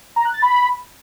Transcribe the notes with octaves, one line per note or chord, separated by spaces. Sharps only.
A#5
F#6
A6
B5